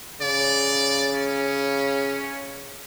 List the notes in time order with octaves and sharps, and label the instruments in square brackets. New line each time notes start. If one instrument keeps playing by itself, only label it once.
[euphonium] C#3 [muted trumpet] D5
[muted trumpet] C#4